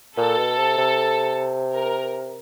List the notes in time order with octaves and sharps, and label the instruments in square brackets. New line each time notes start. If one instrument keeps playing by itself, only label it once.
[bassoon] A#2 [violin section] A4
[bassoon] B2
C3
C3
[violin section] A#4